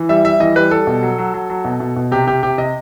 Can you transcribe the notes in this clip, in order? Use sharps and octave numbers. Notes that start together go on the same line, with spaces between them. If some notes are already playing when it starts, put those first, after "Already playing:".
Already playing: E3
G3 E5
G3 E5
E3 D#5
G3 B4
G3 A4
B2
F#3
F#3
F#3
F#3
B2
B2
B2
C3 G4
C3 G4
C3 G4
C3 D#5